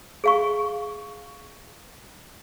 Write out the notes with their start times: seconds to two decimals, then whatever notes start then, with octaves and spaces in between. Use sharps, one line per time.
0.24 G#4 F5 C#6